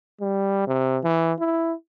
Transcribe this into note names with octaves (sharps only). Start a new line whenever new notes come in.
G3
C3
E3
E4